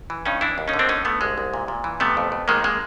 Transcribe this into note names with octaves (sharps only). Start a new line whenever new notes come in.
E3
G2 C#4 D#4
E3 D4 E4
D#2
C#4 D#4
D3
C4 D4
D3 C#4 D#4
D3 A3 B3
C2 G#3
C2
A#2
A#2
E3
C3 A3 B3
F2
F2
D#3 G#3 A#3
G#3 A#3